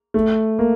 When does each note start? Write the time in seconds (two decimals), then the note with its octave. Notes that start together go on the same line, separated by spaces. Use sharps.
0.14 A3
0.59 A#3